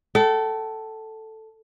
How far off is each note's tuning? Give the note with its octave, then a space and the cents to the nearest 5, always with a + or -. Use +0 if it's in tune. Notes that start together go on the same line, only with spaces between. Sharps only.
A4 +0 G5 -45